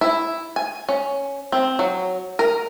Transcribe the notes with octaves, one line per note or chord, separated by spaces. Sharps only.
E4
G#5
C#4
C4
F#3
A#4